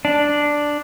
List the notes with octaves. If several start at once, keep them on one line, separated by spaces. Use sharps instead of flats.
D4